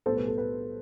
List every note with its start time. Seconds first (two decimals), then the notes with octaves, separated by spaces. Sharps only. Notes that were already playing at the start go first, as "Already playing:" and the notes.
0.06 B1 A2 G3 B3 A4 C5
0.17 B4
0.28 A4
0.38 B4